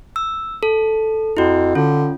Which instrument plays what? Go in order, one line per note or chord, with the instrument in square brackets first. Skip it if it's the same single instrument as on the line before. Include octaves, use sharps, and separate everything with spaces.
[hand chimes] E6
A4
[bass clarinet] F2 [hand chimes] E4 F#4
[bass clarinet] D3 [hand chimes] C#4 F4